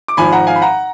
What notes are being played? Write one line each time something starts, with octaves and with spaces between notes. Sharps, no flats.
D6
G#1 G#2 F3 G#5 B5
F#5 A#5
F5 G#5
B5
F#5 A#5